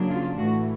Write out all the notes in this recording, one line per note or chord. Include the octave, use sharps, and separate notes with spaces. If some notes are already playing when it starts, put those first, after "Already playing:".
Already playing: C#3 F#3 A#3 D4
F4
A2 E3 A3 F#4